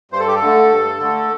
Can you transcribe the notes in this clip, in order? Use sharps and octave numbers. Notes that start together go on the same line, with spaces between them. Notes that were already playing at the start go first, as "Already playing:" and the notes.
G2 C5
A4
G4
A4
D3 A3
G2
D3 A3